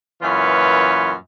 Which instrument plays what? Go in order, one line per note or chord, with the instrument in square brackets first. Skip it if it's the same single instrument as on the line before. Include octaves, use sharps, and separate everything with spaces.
[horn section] F#2 A#2 E3 F4 B4 C#5